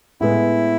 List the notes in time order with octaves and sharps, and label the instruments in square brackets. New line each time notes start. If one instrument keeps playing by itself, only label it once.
[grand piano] A2 G#3 B3 [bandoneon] E4